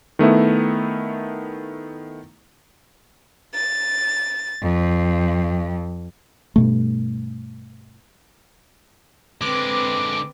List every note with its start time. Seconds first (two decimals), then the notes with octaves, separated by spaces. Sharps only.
0.19 D#3 A3 B3 E4
3.54 A6
4.63 F2
6.56 G2 B2 A3
9.41 D3 G#3 C4 B4 D6